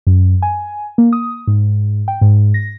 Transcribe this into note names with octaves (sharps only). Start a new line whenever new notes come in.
F#2
G#5
A#3
D#6
G#2
G5
G#2
A#6